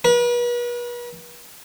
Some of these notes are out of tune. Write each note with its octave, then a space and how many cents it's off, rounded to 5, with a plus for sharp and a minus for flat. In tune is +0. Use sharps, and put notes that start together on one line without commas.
B4 -40